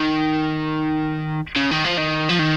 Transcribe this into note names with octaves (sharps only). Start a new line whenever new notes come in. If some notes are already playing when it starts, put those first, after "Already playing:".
Already playing: D#3
C#3
D#3
F3
D#3
F3
D#3